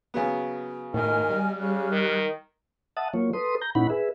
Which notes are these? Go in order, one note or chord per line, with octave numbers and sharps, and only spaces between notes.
C#3 F#3 B3
A2 D#3 D#5 G#5 F6
G3
C#3 G4 F6 F#6
D#3
E5 F#5 A5 D#6
F#3 A#3 F4 C#5
A4 B4 C6 D#6
A#5 G6
A#2 C#4 D#4 E4 F#5 B5
G#4 B4 E5